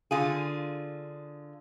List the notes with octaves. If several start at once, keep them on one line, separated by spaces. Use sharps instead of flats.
D3 F4 G#4